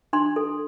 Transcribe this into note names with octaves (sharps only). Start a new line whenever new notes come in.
D4 C6
A4